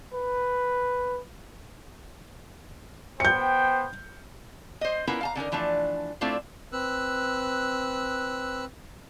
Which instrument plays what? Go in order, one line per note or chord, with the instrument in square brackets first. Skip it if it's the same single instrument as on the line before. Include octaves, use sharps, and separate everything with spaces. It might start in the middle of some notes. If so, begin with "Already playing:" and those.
[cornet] B4
[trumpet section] B3 C5 G5 [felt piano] G6 C#7
[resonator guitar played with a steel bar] C5 D#5
B3 C#4 E4 F4 A#4 B4
F5 A5 A#5
D3 C#4 D#4 A#4
E3 F3 A3 D4
A3 C4 D4 E4 F4
[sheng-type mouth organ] C4 B4 E6 F#6